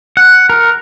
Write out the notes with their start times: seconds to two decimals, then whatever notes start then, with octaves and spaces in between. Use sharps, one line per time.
0.17 F#5
0.50 A#4